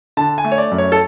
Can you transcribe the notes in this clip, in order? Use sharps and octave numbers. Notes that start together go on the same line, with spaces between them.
D3 A5
G#5
A3
C#5
D5
F#2
C#5
A4